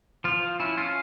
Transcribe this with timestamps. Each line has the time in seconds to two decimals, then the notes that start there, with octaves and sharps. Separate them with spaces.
0.24 F3 F4
0.43 F3
0.60 C#4 E4
0.77 C#4 F4